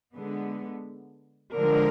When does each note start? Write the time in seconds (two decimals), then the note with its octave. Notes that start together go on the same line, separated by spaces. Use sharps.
0.15 D3 G#3 B3
1.57 D3 F3 G#3 A#4